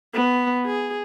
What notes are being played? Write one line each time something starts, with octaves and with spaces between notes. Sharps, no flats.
B3
G#4